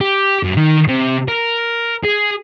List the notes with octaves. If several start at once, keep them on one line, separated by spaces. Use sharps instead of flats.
G4
F#2
D#3
C3
A#4
G#4